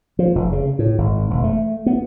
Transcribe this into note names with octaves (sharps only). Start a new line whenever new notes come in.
F3
F1
C#3
A2
G#1
E1
A3
B3